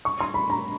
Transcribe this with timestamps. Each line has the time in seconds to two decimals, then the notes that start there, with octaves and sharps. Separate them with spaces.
0.05 C#6
0.20 C6
0.34 B5
0.50 A#5